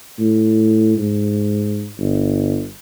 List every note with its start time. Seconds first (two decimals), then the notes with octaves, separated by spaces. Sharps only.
0.19 A2
0.97 G#2
1.98 G1